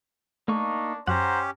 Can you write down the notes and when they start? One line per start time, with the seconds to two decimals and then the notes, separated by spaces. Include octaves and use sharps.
0.48 A3 A#3 D4 D#4 C#6
1.07 F#2 C#4 G4 C5 F#5 A#5